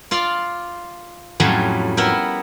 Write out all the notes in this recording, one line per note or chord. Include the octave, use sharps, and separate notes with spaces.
F4 D5 F5
F2 A2 F#3 G3 A3 C#4
B3 E4 A#4 E5 G5